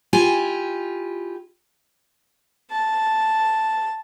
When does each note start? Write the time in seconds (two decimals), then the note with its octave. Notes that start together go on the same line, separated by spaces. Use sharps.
0.13 E4 F4 G4 G#5
2.71 A5